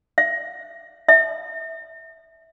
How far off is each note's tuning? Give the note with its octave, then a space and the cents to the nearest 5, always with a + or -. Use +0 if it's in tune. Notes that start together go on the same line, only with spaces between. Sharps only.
E5 +30
E5 -15